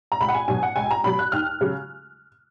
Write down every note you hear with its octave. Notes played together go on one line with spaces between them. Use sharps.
A#5
C#2 B5
F#5
G#5
B2 F#3 G#5
F#5
C#2 G#5
A#5
B2 F#3 B5
F#6
D#2 F6
C#3 F#3